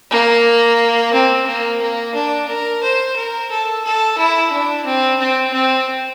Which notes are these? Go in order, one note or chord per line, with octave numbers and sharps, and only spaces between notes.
A#3
C4
A#3
A#3
D4
A#4
C5
A#4
A4
A4
E4
D4
C4
C4
C4